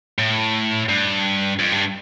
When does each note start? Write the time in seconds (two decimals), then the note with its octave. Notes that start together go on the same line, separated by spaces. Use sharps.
0.19 A2
0.89 G2
1.59 F2
1.72 G2